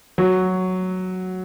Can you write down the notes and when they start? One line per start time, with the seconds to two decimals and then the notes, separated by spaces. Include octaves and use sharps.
0.18 F#3